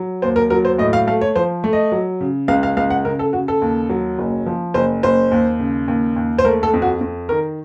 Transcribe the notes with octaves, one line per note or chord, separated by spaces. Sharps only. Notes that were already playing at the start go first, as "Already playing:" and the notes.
Already playing: F#3
D#2 C5
A#4
F#3 A#4
C5
A2 D#5
F5
A3 F5
C#5
F3 C5
A3
D#5
F#3
C#3
C#2 F5
F5
C#2 F5
F#5
C#3 A#4
A4
C#3 F#4
A4
D#2
F#3
F#1
F3
F#1 C5
F#1 C5
D#2
C#3
D#2
D#2
C5
A3 A#4
A4
F2
F#4
F2
D#3 A#4